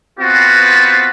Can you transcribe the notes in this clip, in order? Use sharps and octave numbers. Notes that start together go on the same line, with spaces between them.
B3 C4 F4 F#4 B4 A5